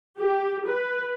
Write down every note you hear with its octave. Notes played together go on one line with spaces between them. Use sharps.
G4
B4